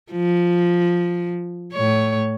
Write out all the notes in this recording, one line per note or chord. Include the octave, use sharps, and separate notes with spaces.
F3
A2 C#5